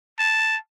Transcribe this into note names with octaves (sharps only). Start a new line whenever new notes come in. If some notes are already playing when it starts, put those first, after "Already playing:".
A5